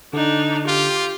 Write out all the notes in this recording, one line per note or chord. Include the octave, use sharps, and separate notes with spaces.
D3 D4 D#4
F4 G4